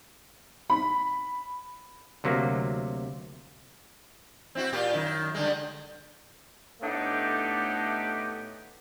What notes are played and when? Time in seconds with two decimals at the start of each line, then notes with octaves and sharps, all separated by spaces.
0.70 B5
2.24 D2 C3 F#3 A#3
4.55 C4 E4 F#4
4.73 A#2 F4 G4
4.93 F#2 D#3 E4
5.34 D3 G3 G#3
6.82 A2 A3 B3 D4 D#4 G4